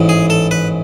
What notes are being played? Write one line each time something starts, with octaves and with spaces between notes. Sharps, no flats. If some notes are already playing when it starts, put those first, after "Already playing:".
Already playing: A1 G#2 E3
G#4
A4
B4